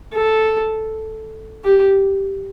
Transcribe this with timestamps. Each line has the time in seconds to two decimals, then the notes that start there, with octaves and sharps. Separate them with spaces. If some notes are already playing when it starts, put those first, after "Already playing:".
0.14 A4
1.64 G4